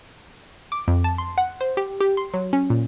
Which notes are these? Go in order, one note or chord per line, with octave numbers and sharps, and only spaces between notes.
D6
F2
A5
C6
F#5
C5
G4
G4
C6
F#3
C#4
A#2